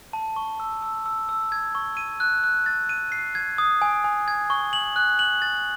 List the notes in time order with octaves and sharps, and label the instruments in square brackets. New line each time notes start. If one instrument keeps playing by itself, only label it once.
[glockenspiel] A5
C#6
E6
E6
E6
E6
G#6
C#6
D#7
F#6
F#6
A6
D#7
C7
G#6
D#6
G#5
G#5
G#6
C#6
F#7
F#6
F#7
A6